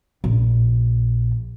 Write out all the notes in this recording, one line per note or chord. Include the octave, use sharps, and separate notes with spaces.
A#1